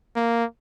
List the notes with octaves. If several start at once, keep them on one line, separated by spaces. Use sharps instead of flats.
A#3